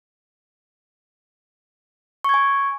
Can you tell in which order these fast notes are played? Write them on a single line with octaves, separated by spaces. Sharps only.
C#6 G#6 G#5